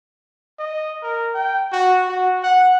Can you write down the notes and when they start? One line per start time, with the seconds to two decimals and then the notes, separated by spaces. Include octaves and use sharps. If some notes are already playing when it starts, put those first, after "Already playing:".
0.59 D#5
1.03 A#4
1.35 G5
1.72 F#4
2.09 F#4
2.43 F#5